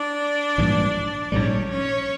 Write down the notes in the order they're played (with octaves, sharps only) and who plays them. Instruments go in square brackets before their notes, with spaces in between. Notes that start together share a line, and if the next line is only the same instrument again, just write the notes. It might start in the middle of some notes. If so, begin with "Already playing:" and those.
Already playing: [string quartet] D4 D5
[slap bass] A#1 G#2 E3 G3
[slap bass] A#1 G#2 E3 G3 [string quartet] C#4 C#5
[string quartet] C#4 C#5